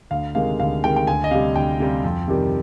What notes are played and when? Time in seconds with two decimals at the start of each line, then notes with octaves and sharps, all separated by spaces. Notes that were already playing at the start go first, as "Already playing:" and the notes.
0.11 D2 F5
0.35 C3 D#3 G#3 F5
0.60 D2 F5
0.84 C3 D#3 G#3 G5
0.96 G5
1.07 D2 G#5
1.24 D#5
1.31 C3 G3 F5
1.55 D2 G5
1.80 C3 G3
2.04 F2
2.28 C3 D#3 G3